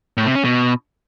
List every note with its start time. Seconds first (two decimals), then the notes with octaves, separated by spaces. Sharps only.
0.17 A2
0.26 C3
0.35 C#4
0.44 B2